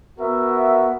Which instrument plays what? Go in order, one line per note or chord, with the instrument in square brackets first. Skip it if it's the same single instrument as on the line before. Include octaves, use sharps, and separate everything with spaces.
[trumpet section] B3 F#4 A#4 E5